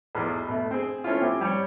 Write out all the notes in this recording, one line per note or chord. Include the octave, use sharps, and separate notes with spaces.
B1 E2
B2 A3
C4 G#4
A3 C#4 E4 F4
C4 E4 G4
G3 C#5